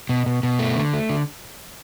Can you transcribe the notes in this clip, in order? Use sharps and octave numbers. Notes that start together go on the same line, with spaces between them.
B2
B2
B2
A3
D3
A3
D3